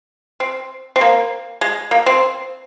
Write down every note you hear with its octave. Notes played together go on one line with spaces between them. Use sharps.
C4
C4
A#3
G#3
A#3
C4